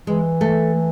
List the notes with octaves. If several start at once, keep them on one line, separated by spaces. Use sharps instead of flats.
E3 G#3
A3